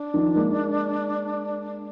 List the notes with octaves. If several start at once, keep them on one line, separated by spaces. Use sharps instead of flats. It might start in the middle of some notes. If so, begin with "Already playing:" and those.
Already playing: D4
D#3 F3
G#3 A#3